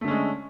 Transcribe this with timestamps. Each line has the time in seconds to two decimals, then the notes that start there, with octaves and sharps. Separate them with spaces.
0.01 A3
0.05 D3
0.08 C#4
0.11 G#3